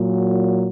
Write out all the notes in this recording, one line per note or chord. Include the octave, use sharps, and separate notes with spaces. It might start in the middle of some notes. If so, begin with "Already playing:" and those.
Already playing: A#2 F#3